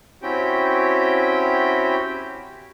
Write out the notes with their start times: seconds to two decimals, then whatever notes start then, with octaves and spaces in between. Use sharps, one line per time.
0.22 C4 C#4 E4 F#4 G4 G5